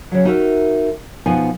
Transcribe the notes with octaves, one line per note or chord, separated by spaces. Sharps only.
C#3 F#3
D#4 E4 F#4 A#4 E5
B2 F3 B3 D#4 G#5